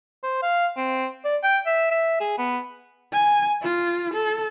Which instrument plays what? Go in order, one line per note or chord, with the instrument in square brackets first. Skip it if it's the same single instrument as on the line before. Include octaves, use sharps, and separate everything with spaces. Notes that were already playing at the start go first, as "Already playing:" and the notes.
[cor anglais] C5
F5
C4
D5
G5
E5
E5
G#4
B3
[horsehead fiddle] G#5
F4
A4